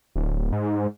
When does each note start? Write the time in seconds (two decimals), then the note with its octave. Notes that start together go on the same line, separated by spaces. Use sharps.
0.15 D1
0.52 G#2